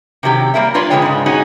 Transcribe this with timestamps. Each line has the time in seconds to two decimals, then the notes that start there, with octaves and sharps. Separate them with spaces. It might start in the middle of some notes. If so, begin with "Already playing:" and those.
0.23 C3 D#3 F#3 G4
0.54 G3 A#3 A#4 E5
0.74 D4 F4 B4 C#5 D5
0.90 F2 D3 E3 G#3 C#5 G5
1.02 G#2 C#3
1.26 C#4 D#4 F#4 G#4